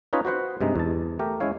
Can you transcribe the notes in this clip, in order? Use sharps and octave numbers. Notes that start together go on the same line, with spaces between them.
C#4 D#4 F4 B4 C#5 D#5
F#4 B4 C5 F#5
G2 C3 G#3 D#4
E2 A5
A3 G4 A#4
G#3 C#4 E4 C#5 F5